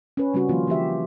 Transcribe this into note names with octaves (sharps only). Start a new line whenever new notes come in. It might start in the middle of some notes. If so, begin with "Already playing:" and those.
C#4 B4
C#3 G3 C4 C#4 F#4
D#3 F3 A#3 F4
E3 F#4 G4 E5